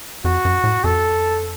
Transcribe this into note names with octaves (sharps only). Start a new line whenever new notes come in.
F2 F#4
F#2
A2
F2 A4